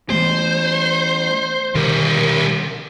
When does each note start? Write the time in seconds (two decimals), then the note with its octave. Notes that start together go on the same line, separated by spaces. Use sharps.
0.10 E3 A3 B3 C5
1.75 B2 D3 D#3 G3 A#4